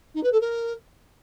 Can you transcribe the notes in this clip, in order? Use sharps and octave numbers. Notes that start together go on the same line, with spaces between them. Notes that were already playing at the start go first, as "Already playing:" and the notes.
D#4
B4
A4
A#4